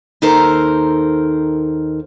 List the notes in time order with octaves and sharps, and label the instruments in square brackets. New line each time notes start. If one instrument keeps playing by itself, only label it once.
[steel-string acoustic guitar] D#2 D#4 A4 A#4 C5 A#5